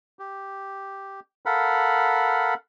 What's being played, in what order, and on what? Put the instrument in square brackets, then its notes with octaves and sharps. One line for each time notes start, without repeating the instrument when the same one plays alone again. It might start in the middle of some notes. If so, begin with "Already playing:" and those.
[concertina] G4
A4 A#4 F5 F#5 B5